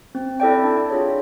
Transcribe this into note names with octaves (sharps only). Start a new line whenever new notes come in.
C4
E4 A4 D5 G5
D4
F4 G#4 C#5